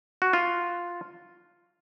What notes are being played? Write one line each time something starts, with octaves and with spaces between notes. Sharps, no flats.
F#4
F4